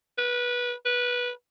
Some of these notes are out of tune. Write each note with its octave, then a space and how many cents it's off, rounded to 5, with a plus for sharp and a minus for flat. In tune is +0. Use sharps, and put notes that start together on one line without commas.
B4 -20
B4 -15